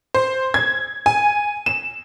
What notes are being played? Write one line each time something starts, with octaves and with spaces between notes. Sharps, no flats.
C5
G#6
G#5
E7